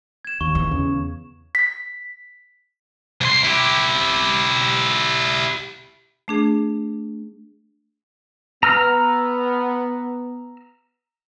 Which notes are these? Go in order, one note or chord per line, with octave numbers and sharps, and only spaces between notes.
G#6 E7
D#2 C#6
E2
C#3
B6
C2 C6
E4 G4
A3 D4 G#4
B3 A#5 E6 F6